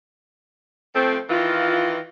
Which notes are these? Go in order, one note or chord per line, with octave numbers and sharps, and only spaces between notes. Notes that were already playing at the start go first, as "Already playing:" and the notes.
F3 A3 C4
D#3 E3 F4